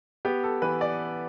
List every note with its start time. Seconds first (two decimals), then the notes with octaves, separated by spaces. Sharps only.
0.25 B3 G4
0.44 A4
0.62 E3 B4
0.81 D5